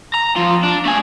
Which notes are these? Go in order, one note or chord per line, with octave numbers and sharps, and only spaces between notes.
A#5
F2 F4
D4
A3 G#5